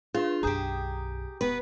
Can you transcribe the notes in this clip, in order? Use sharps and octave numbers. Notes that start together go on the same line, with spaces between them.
D4 F4 G#4
B1 F#2 G4 G#4 A#5 D#6 G6
D#1 B3 B4